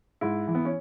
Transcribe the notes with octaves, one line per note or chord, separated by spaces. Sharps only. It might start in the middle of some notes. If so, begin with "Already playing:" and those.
G#2 E4
E3
B3
C#4